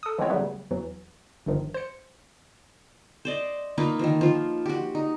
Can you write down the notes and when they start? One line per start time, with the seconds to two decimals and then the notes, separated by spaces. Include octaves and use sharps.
0.03 A4 D#6
0.18 E3 F3 G#3 B3 C4 C#5
0.30 C#3 F#3 G3 A3 B3
0.71 E2 E3 F#3
1.46 G1 G2 D#3 F3
1.74 C5 C#7
3.25 C5 D5 D#5
3.78 A#3 D#4 F4 B4
3.99 D#3 F3
4.21 F3 F4
4.66 F#4 G4
4.95 D#4